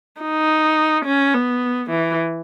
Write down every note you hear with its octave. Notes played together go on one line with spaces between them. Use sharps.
D#4
C#4
B3
E3